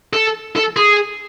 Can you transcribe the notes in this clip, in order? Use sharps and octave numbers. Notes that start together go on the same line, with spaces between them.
A4
A4
G#4